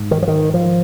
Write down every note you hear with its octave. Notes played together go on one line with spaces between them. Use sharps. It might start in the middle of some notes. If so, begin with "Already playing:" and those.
Already playing: G#2
D#3
F3
D#3
F3